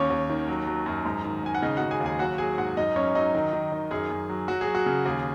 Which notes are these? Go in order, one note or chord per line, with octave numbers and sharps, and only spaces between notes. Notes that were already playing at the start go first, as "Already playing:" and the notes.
Already playing: D#2 C#4 C#5
D#2
D#3
F#3
F#3
F#2
G#2
D#3
G#2 G#5
F#5
C#3 D#4 D#5
C#3 F#4 F#5
G#4 G#5
D#2
G#4 G#5
F#3 F#4 F#5
F#3 G#4 G#5
G#2 F#4 F#5
F#2 D#4 D#5
F#2 C#4 C#5
F#3 D#4 D#5
D#3
D#3
D#3
F#2 G#4
F#2
F#3
F#3 F#4
G#4
F#3
F#4
C#3
D#2 G#4